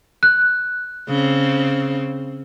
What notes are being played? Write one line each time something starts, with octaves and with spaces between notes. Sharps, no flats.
F#6
C#3 C4